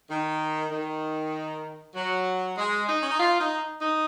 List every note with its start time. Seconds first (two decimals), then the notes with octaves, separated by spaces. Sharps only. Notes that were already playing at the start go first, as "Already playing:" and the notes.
0.09 D#3
0.72 D#3
1.95 F#3
2.57 G#3
2.88 D#4
3.00 C#4
3.10 D#4
3.20 F4
3.40 D#4
3.82 D#4